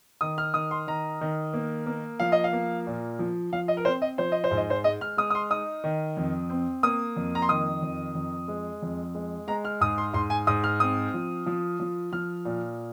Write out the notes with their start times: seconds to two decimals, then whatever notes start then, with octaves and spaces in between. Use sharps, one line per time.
0.21 D#3 D#6
0.38 F6
0.54 D#3 D#6
0.71 C6
0.87 D#3 A#5
1.21 D#3
1.54 A#3
1.86 A#3
2.20 F3 F5
2.32 D#5
2.44 F5
2.53 A#3
2.87 A#2
3.19 F3
3.52 F3 F5
3.68 D#5
3.77 A#4
3.85 C4 C5
4.02 D#5
4.18 F3 C5
4.32 D#5
4.44 C5
4.51 G#2
4.57 D#5
4.70 C5
4.84 G#3 D#5
5.01 F6
5.17 G#3 D#6
5.30 D#6
5.35 C6
5.50 D#4 D#6
5.84 D#3
6.17 F2
6.50 C4
6.83 A#3 D#6
7.16 F2
7.35 A#5
7.42 C6
7.49 D#3 D#6
7.83 F2
8.15 F2
8.48 G#3
8.82 F2
9.15 G#3
9.48 G#3 A#5
9.65 F6
9.81 G#2 D#6
9.98 C6
10.14 G#2 C6
10.30 G#5
10.47 G#2 D#6
10.64 F6
10.80 C4 D#6
11.14 F3
11.46 F3
11.80 F3
12.12 F3 F6
12.45 A#2